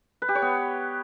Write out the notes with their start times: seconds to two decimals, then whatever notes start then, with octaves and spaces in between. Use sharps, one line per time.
0.22 B4
0.29 G4
0.35 C#5
0.42 B3